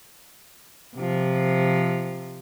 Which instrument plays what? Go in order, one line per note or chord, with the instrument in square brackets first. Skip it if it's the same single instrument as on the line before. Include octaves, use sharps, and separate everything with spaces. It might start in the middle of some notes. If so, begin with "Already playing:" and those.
[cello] C3 F3